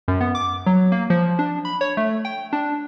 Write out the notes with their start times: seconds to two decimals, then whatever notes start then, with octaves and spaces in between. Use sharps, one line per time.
0.08 F#2
0.21 B3
0.35 D6
0.66 F#3
0.92 A#3
1.10 F3
1.39 D4
1.65 B5
1.81 C#5
1.97 A3
2.25 G5
2.53 D4